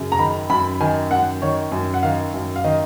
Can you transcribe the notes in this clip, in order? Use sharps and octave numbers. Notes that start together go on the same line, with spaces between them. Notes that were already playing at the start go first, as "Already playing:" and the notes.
Already playing: F#2 C#3
A#5
D#3 B5
F#2 B5
D#3 G#5
F#2 F#5
D#3 C#5
F#2
F#5
D#3 F5
F#2
F5
D#3 D#5